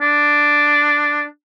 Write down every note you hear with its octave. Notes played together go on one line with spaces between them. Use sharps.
D4